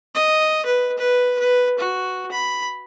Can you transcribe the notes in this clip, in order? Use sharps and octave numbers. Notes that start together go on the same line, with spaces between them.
D#5
B4
B4
B4
F#4
B5